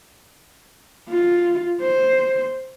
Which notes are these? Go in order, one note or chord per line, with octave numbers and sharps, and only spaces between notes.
F4
C5